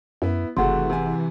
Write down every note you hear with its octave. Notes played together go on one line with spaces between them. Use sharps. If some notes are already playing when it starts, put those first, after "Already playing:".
F#2 B3 E4
F#1 C3 E3 A3 F#4 G#4 F#5 C6
C3 G#5